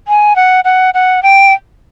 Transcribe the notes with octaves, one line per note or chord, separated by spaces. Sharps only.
G#5
F#5
F#5
F#5
G5